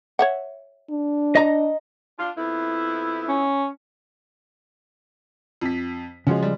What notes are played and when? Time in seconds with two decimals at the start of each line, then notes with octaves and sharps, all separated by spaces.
0.19 C#5 E5 F#5
0.90 D4
1.35 D#5 A#5
2.19 D4 F4
2.37 F2 B3 E4
3.28 C#4
5.61 F2 B6
6.27 C#3 F3 G#3 C#4 F#4
6.43 G3